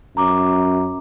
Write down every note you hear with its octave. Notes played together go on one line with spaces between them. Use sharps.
F#2 A#5 D6